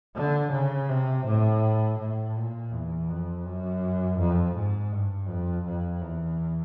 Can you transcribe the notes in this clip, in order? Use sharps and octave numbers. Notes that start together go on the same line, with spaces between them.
D3
C#3
C3
A2
A2
A#2
E2
F2
F#2
F2
G#2
G2
F2
F2
E2